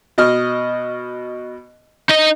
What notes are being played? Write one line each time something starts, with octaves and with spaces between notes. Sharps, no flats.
B2 D#5 F6
D#4 D#5